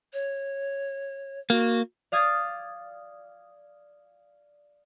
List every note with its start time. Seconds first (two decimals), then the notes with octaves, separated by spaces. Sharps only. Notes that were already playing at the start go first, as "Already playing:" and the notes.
0.13 C#5
1.50 A#3 F#4
2.12 D5 F5 D#6 G#6 A6